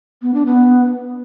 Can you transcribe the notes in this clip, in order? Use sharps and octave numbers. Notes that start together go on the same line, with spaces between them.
B3
D4
B3